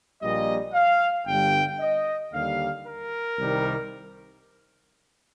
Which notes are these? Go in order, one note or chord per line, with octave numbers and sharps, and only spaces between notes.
A#1 A#2 G3 D#5
F5
G1 G2 D3 G3 G5
D#5
D#2 D3 G3 F5
A#4
C2 C3 D#3 G3